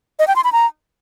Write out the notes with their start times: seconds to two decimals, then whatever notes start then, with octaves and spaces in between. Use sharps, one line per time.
0.19 D#5
0.28 G5
0.36 C6
0.44 B5
0.53 A#5